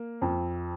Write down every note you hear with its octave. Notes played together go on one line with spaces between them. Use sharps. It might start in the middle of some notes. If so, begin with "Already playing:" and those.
Already playing: A#3
F2